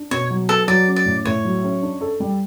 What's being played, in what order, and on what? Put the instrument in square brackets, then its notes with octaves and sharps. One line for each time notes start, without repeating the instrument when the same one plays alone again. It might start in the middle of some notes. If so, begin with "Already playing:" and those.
Already playing: [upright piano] D4
[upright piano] B2 [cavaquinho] C#5
[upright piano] F#3
[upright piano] B3 [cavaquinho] A4
[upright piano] F#3 [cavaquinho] D5
[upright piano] C#4
[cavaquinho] D5
[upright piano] A2
[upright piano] A2 [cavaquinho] C#5
[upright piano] F#3
C#4
D4
A4
G3